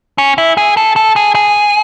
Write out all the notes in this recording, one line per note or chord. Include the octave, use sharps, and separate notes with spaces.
C#4
E4
G#4
A4
A4
G#4
G#4